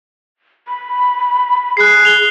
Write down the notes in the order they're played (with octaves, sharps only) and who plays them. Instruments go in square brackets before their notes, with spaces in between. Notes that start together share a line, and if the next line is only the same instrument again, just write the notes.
[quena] B5
[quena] G#4 [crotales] F#6 C7
[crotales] F7 G7